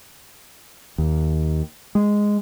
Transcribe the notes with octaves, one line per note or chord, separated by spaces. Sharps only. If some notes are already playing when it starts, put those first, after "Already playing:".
D#2
G#3